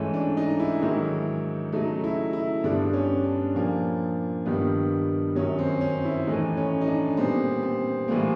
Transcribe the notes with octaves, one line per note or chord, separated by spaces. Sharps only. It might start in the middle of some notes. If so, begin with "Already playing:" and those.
Already playing: G#2 E3 A3 C#4
D4
D#4
E4
G#2 D#3 F#3 E4
C#3 F#3 A3 D#4
E4
E4
G2 D3 G3 B3 D4
C#4
D4
A#2 F3 A#3
G2 D#3 G3 B3
F#2 D#3 F#3 C#4
C4
C#4
E4
A2 E3 A3 D#4
C#4
D#4
D4
A#2 G3 B3 C4
C4
A2 E3 G3 A#3